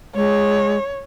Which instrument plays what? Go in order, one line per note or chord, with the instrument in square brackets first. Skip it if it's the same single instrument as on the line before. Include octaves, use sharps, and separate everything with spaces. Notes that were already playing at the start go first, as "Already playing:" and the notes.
[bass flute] G#3 [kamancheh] C#5